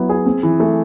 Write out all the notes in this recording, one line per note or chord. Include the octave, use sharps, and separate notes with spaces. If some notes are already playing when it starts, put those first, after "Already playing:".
Already playing: F#3 B3 E4
G#4
C4
E3
A3